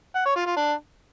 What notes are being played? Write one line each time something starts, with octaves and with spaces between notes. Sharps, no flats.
F#5
C#5
F4
F4
D4